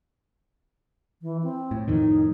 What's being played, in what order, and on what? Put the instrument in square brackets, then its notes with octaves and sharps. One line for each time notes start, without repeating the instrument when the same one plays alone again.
[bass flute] E3
C4
[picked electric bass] A2
[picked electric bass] F2 A2 D#3 [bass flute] D#4